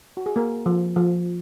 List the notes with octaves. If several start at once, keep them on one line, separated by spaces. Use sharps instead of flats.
F#4
G#4
A#3 A#4
F3
F3